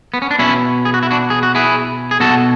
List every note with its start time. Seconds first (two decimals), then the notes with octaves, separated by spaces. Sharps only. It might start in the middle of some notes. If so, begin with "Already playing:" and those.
0.14 B3
0.22 C#4
0.31 D4
0.39 B2 C#4 E4
0.85 G#4
0.94 F#4
1.03 E4
1.11 D4 F#4
1.30 G#4
1.43 F#4
1.55 E4 G#4
2.11 G#4
2.20 B2 F#4 A4